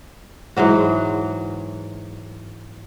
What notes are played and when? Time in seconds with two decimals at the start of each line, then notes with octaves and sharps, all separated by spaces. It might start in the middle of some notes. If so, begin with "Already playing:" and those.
0.57 G#2 E3 F#3 F#4